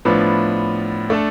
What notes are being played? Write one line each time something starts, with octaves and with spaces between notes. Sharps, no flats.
A2 F3 B3 D4
A3 D4 A4